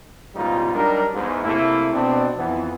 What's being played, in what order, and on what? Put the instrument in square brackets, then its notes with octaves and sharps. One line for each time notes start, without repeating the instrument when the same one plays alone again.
[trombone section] A1 G#2 B2 G3 D#4 F4
F#3 G3 D4 D#4 A#4
E2 G#2
C3 A3 A#3 E4
B2 C4 D4
F2 E3 B3